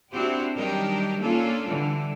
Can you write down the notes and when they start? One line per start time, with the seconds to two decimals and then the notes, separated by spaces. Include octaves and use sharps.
0.12 C4 D4 E4 F#4 G4 C5
0.56 D#3 F#3 G3 D4 G4 A#4
1.20 A#3 C#4 D4 F4 A4
1.66 D3 E3 G3